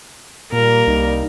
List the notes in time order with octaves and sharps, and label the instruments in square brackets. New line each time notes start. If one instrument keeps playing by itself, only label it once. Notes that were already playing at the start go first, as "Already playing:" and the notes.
[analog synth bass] A#2 [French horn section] G3 A#3 [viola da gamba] A#4
[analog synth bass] C2 [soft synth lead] D#4